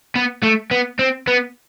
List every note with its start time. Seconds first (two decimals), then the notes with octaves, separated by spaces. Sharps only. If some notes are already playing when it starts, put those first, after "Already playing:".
0.15 B3
0.43 A3
0.71 B3
0.99 C4
1.28 B3